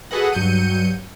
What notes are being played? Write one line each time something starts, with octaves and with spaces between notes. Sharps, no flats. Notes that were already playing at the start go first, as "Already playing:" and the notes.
F#4 G#4 A4 B4 D#5 F#5
G2 F#3 G6 C#7 D#7